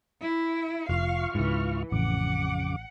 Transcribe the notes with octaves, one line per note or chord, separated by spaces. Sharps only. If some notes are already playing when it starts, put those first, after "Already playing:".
E4
F1 F4 F5 C#6 F6
C#2 G#2 E3
A1 F2 C#3 F#5 D6